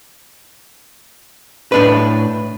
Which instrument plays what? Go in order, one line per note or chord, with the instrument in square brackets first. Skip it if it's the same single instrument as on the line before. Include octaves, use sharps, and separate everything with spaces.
[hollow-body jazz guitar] A2 D4 B4